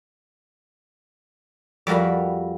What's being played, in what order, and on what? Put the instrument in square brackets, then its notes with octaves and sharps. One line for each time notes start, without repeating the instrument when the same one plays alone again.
[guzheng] F2 G3 F#4 A#4 B5